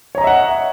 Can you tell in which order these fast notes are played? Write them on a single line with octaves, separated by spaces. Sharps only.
C#5 A#5 D#5 E5 F#5